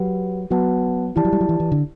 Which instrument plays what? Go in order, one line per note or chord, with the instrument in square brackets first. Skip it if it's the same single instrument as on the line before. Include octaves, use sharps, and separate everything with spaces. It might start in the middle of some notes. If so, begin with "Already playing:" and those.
Already playing: [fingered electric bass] F#3 [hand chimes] G4 B4 F#5
[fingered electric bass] F#3 [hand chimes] B3 F#4 B4 F#5 A5
[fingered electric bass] E3 [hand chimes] E4 G4 D5 A5
[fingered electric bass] F#3
G3
F#3
E3
E3
D3